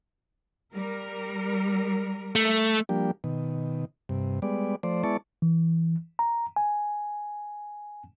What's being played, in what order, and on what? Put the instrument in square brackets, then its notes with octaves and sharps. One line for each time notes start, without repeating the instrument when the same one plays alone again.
[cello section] G3 A#4
[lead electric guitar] A3
[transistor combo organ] F3 G3 A#3 D4 G4
B2 D#3
G2 C3
G3 G#3 B3 D5
F3 A3 C5 D5
G#3 B3 E4 D5 A5 C#6
[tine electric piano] E3
A#5
G#5